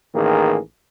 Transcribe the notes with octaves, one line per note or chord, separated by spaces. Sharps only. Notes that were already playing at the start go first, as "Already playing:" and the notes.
A1 D#3 A#3 G#4